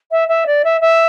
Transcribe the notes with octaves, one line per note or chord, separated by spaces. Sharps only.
E5
E5
D5
E5
E5